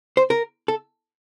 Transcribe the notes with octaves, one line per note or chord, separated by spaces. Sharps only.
C5
A#4
A4